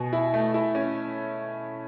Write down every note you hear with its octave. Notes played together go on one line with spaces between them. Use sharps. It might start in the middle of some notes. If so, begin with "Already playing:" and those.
Already playing: B2 G#5
E4
A3
E4
C#4